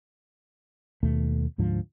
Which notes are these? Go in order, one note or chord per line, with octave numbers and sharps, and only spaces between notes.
D#2 B2 A3
D2 G#2 D3 F3